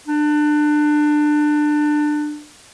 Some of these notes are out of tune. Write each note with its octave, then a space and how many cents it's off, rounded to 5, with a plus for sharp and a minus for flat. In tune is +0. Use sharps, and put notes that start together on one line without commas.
D4 +25